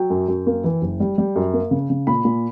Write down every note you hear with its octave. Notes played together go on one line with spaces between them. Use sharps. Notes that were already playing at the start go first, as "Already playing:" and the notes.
Already playing: F#3 G5
F#2
F#2
A#3
E3
F#1
G3
G3
F#2
A#3
C#3
C#3
A#2 B5
A#2